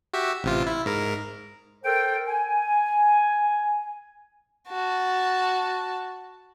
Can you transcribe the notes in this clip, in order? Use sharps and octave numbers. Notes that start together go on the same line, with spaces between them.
F#4 G4 E5
A1 C3 F4
E4
G#2 A#4
A4 A#4 C5 G5
G#5
F#4 A5